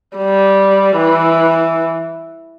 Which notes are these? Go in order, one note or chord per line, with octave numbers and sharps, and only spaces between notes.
G3
E3